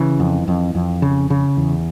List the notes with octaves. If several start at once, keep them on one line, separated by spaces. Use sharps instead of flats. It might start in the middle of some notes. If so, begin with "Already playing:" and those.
Already playing: C#3 E3
F2
F2
F2
C#3
C#3
E2